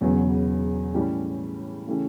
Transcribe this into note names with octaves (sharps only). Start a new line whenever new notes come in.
E1 E2 C#3 F#3 B3
A2 E3 G3 C#4 G4
C#3 E3 A3 C#4 G4